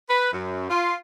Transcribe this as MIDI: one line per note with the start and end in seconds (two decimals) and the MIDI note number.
0.09 0.31 71
0.32 0.67 42
0.70 0.96 65